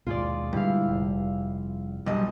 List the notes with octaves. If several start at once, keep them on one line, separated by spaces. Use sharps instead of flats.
D#2 G#2 B2 F4 G#4 D5
G2 A#2 D3 G#3 E4 F5
F1
B1 G2 D#5